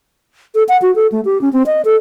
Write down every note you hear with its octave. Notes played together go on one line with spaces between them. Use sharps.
A4
F#5
F#4
A4
A3
G4
C#4
C4
D#5
A4